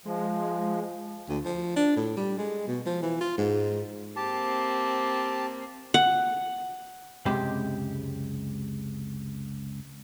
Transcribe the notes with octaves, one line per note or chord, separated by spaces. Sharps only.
F3 G#3
D2
F3
D4
A2
G3
G#3
B2
F3
E3
F4
G#2
A#3 C4 G4 A5
F#5
C#2 F#2 C3 G#3 G4 B5